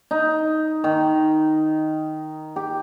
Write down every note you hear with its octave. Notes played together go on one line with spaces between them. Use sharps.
D#4
D#3
G4